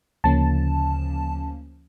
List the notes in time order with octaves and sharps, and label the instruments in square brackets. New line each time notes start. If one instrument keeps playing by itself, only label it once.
[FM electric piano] D2 C#3 F3 A#3 C#4 A5